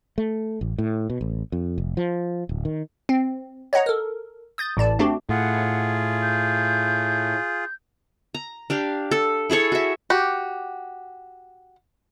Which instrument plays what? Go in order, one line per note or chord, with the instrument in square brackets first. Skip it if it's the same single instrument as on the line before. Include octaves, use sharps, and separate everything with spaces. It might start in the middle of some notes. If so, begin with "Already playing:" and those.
[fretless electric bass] A3
A1
A2
B2
A1
F2
F1
F3
D1
D#3
[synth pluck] C4
C#5 D#5 F#5 A#5
A4 A#4
D#6 G6 A6
A1 A2 D5 A5
A3 C4 D4 F#4 G4
[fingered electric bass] A2 [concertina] F4 G#4 [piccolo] F#5
[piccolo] G6
[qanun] A#5
D4 G4 F5
A4
E4 G#4 A4 C#5
F#4 E5
[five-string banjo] F#4 G4